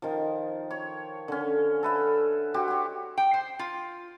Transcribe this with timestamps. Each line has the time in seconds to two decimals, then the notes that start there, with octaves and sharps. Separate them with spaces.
0.02 D#3 F3
0.71 C#5
1.28 D3 C#4
1.83 A4 B4 E5
2.54 F#4 G4 C5 G5
2.68 G4 C#5
3.18 G5
3.34 C5
3.59 F4